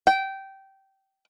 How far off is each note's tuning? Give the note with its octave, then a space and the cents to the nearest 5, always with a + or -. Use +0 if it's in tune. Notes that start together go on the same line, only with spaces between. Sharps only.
G5 -15